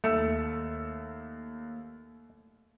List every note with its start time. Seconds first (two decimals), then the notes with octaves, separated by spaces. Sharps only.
0.04 D#2 A3 E6 C#7